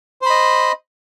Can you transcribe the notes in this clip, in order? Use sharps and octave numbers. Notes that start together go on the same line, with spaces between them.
C5 D#5 B5